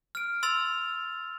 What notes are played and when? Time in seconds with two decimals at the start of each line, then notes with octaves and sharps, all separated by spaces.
0.15 F6 D7
0.43 C6 E6 A6 F7